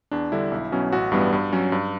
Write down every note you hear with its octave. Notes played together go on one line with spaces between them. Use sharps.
E2 D4
D3 G3 E4
B1
B2 F#3 C#4
A1 F#4
G2 E3 G3 B3
G2
F#3 C#4
G2